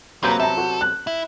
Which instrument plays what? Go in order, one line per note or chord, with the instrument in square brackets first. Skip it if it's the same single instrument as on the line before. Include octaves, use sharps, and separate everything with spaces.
[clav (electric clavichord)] C3 F#3 B4 [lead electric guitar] A#3 [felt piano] A#5 G6
[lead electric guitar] A4 [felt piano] E5 A#5
[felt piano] F#4
F#6
[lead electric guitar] E4